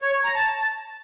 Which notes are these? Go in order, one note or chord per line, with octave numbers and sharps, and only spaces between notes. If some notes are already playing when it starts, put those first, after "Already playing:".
C#5
C#5
A#5
A5